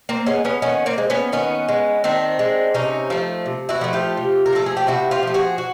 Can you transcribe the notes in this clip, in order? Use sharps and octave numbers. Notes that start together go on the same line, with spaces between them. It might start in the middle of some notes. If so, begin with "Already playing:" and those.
A#3 C4
G#3 B3 C#4
B3 C#4
D#3 B3 C#4
A#3 C4
G#3
B3 C#4
D#3 B3 C#4
G#3
D#3 C4 D4
G#3
C3 C#4 D#4
F3 A3
C3
E4 F#4
F3 A3
F4 G4
C3
A#4
F3 A3 A4
G#4
G4
C3 E4 F#4
F4 G4
F3 A3
F#4 G#4
F#4